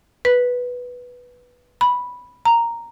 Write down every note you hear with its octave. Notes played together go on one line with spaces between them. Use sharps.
B4
B5
A#5